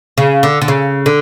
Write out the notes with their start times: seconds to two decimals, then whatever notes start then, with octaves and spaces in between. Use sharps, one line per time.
0.18 C#3
0.43 D3
0.62 D3
0.68 C#3
1.06 D3